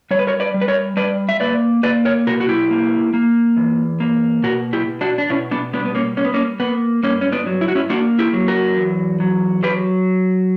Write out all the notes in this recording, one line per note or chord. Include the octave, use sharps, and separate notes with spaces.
G3 C#5
B4
A#4 C#5
B4 D5
G3
B4
A#4 C#5
G3 B4 D5
E5
A#3 B4 D5
A#3 B4 D5
A#4 C#5
B2 F#4 A#4
F#4
E4 G4
A#3
A#3
E2
A#3
B2 F#4 A#4
E4 G4
B2
D4 F#4
D4
B2 C#4 E4
B3 D4
G3 B3 D4
B3
A#3 C#4
A#3 C#4
B3
A#3 C#4
A#3 B3
G2 A#3 C#4
C#4
B3 D4
F#3
E4
F#4
C#4 E4
A#3 D4 F#4
E4 G4
F#3
F#4 A#4
E2
F#3
F#3 G4 B4